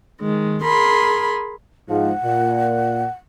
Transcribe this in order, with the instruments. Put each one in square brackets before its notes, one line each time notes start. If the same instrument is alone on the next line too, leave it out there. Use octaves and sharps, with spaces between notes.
[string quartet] D#3 G#3
G#4 A#4 B5 C6
[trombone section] G#2 F3 [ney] F#5
[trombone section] A#2